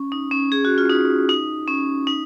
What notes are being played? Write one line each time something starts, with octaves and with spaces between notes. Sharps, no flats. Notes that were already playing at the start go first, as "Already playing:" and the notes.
Already playing: C#4
D#4
C#4
G#4
F#4
F4
D#4
D#4
C#4
D#4